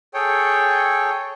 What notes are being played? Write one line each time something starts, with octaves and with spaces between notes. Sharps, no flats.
G#4 A4 C#5 G5